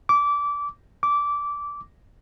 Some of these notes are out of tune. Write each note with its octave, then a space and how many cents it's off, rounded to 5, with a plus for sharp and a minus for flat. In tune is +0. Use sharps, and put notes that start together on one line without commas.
D6 -20
D6 -15